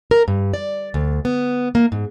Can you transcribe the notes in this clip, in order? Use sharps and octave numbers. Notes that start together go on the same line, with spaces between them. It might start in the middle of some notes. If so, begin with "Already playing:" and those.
A#4
G2
D5
D2
B3
A#3
G#2